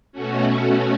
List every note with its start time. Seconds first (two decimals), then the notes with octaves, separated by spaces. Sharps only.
0.12 B2 A3 C#4 F#4
0.63 F#4